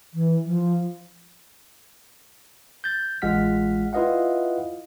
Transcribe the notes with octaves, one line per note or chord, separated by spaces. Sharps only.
E3
F3
G6 A6
A1 G#3 F4 F#5 F6 B6
E4 F4 B4 D#5 F5 F#5